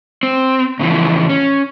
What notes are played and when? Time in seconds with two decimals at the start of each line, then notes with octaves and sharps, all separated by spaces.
0.23 C4
0.80 A2 C#3 E3 F3
1.29 C#4